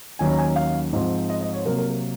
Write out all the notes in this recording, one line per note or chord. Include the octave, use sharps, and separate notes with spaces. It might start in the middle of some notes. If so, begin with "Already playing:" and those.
D#2 D#3 F#3 C#4 G#5
A#5
G#5
F5
G#2 F3 C4
D#5
D#5
C#5
C3 F#3 A#3 A#4
A#4
A#4